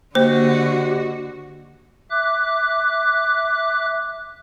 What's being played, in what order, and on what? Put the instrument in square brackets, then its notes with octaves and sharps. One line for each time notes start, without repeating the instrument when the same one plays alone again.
[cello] D3 F#4 [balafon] A#3 [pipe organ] G4 D#5 [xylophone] C5
[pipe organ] E5 D6 F#6